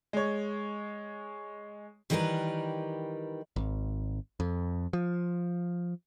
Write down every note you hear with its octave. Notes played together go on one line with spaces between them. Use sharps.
G#3 C#5
D#3 E3 G3 G4 A#4 B4
G#1
F2
F3